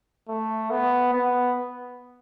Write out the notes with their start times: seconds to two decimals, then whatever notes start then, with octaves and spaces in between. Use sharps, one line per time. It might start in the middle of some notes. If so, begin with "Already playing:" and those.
0.29 A3
0.70 B3
1.13 B3